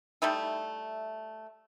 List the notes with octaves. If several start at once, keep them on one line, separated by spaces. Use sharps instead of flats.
G3 A3 D#4 E4